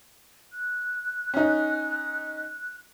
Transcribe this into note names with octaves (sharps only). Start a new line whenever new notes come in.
F#6
C#4 D#4